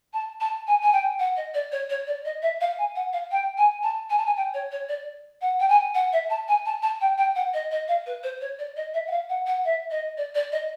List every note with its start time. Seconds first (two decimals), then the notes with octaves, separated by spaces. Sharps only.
0.13 A5
0.40 A5
0.67 G#5
0.81 G#5
0.92 G5
1.19 F#5
1.36 D#5
1.54 D5
1.71 C#5
1.89 C#5
2.06 D5
2.25 D#5
2.42 E5
2.60 F5
2.78 G#5
2.95 F#5
3.13 F5
3.31 G5
3.57 G#5
3.82 A5
4.10 G#5
4.17 A5
4.25 G#5
4.36 G5
4.53 C#5
4.71 C#5
4.88 D5
5.41 F#5
5.59 G5
5.68 G#5
5.94 F#5
6.12 E5
6.29 A5
6.48 G#5
6.65 A5
6.82 A5
7.00 G5
7.17 G5
7.35 F#5
7.53 D#5
7.71 D#5
7.88 F5
8.06 B4
8.23 C5
8.41 C#5
8.58 D5
8.76 D#5
8.93 E5
9.07 F#5
9.10 F5
9.29 F#5
9.46 F#5
9.64 E5
9.90 D#5
10.17 D5
10.34 D5
10.52 D#5